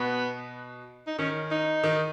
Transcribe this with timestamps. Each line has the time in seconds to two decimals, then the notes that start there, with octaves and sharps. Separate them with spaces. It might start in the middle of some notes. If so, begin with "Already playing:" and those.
Already playing: B2 B3
1.07 D#4
1.19 D#3 C#4
1.51 D#4
1.84 D#3